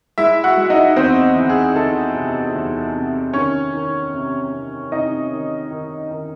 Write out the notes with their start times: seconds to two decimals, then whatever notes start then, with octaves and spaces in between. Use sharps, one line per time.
0.18 G#3 E4 E5
0.44 F#4 F#5
0.57 G#3
0.70 D#4 D#5
0.96 E2 C4 C5
1.36 E3
1.49 G#4
1.76 E3 A4
2.15 C3
2.55 E2
2.95 C3
3.33 D#3 C#4 C#5
3.73 D#3
4.13 C3
4.53 C3
4.92 C3 D#4 D#5
5.31 D#3
5.71 D#3
6.11 D#3